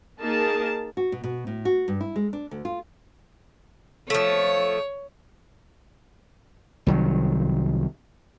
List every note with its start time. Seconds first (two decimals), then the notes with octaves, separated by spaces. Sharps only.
0.20 A#3 D#4 G#4 A#4 A5
0.97 F#4
1.12 B2
1.24 B2
1.47 A2
1.65 F#4
1.88 G2
2.01 E4
2.16 G#3
2.33 D4
2.51 D2
2.65 F4
4.10 F3 A3 C#5
6.87 C2 D#3 F#3